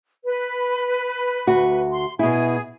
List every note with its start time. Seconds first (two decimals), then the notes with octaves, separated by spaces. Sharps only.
0.24 B4
1.47 D2 F#4
1.92 C6
2.19 B2 E4 G#4